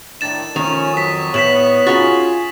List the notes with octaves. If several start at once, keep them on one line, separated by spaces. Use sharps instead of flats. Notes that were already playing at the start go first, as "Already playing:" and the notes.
A2 D#3 D4 A6 E7
D#3 F3 A3 C#4 C#6 F7
F2 F#3 D#6 B6
A2 B3 C#5 B6 E7 F#7
C#4 D#4 F4 F#4 G#4 A6